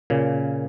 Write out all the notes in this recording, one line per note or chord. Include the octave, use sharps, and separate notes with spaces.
A#2 C#3